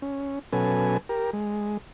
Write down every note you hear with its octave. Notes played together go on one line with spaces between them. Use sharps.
C#4
B2 F#3 C#4 A4 B4 G#5
G4 A#4
G#3